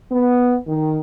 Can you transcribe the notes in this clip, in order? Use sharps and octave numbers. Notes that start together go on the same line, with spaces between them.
B3
D#3